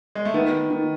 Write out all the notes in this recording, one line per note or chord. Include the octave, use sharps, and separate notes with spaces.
G#3
A3
D#3 B3
D#3